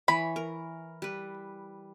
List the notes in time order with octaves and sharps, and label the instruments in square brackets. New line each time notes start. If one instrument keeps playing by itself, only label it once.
[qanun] E3 C#5 [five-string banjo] B5
[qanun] A#4
G3 B4